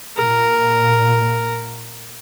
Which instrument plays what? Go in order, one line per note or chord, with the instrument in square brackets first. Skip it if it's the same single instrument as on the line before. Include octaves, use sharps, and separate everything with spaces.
[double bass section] A#2 [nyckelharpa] A#4